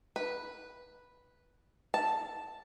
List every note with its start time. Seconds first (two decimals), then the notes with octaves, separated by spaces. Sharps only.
0.16 B4
1.94 A5